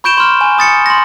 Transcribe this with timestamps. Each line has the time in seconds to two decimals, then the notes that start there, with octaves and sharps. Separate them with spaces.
0.04 B5 C#6 G6 D7 E7 G7
0.18 C6 F6
0.41 G#5
0.59 D#6 A6 C#7
0.86 C6 A#6